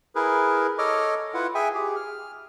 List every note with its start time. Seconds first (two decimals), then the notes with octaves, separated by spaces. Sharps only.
0.15 E4 G#4 A#4 B4
0.78 A4 C#5 D#5 D6 F6
1.34 E4 F4 B4 F#5
1.55 G#4 E5 G5 G#5
1.74 G4 G#4
1.96 F6